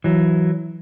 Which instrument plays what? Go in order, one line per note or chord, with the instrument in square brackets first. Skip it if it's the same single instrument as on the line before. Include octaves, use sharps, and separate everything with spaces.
[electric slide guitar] E3 F#3